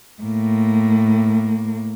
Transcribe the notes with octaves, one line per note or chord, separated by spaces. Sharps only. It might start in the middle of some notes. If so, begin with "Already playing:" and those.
A2 A#3